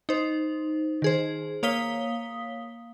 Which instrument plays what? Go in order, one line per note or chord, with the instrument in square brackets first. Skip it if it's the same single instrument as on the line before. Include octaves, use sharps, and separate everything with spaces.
[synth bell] D#4 C5
D#3 G#4 C5
A#3 C#5 F5 D#6 B6 G7